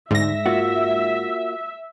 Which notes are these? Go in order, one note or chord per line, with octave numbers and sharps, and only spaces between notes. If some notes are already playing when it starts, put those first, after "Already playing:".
D2 G#2 E5 A#6
A#3 F4 F#4